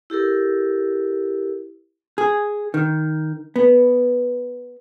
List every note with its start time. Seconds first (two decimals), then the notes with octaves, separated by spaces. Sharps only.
0.10 E4 G4 A4 A#4
2.18 G#4
2.74 D#3
3.56 B3